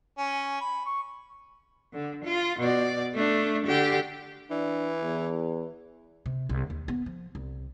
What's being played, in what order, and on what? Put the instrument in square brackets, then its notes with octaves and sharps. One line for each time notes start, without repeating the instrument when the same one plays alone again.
[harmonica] C#4
B5
C#6
[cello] D3
F4
B2 D5
A3 D4
D3 G4
[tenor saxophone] E3 [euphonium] D4
[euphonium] E2
[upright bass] C3
C2
D#2
B3
F3
C2